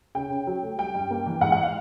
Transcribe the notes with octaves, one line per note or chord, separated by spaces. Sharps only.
C#3 G5
C#3
F#3
A3
G3 G5
G2
A#3
E3
G#2 F#5
F#5
F5